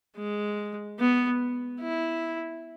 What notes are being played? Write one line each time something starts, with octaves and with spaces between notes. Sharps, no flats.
G#3
B3
E4